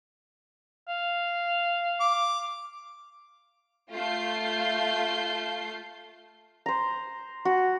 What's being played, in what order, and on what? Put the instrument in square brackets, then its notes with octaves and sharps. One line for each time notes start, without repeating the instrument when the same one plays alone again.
[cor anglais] F5
[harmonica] D6
[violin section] A3 F4 F5 G6 C7
[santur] C5 A#5
F#4